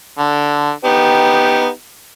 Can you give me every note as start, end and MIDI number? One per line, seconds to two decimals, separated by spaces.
0.19 0.71 50
0.85 1.68 59
0.85 1.68 63
0.85 1.68 67